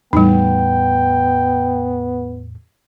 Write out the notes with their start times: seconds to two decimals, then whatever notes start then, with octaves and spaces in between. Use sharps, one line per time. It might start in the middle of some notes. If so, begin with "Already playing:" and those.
0.13 E2 A2 G3 B3 D#4 G5